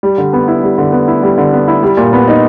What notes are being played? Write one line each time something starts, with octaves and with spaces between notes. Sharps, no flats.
G3
D3
B3
E4
G3
D3
B3
E4
G3
D3
B3
E4
G3
A#2
B3
D#4